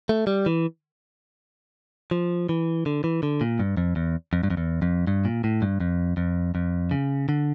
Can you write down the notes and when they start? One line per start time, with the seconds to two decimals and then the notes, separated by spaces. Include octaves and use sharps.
0.09 A3
0.27 G3
0.46 E3
2.11 F3
2.49 E3
2.86 D3
3.04 E3
3.23 D3
3.41 A#2
3.59 G2
3.77 F2
3.96 E2
4.33 F2
4.43 G2
4.50 F2
4.57 E2
4.82 F2
5.07 G2
5.25 A#2
5.44 A2
5.62 G2
5.80 F2
6.17 F2
6.55 F2
6.91 C#3
7.29 D3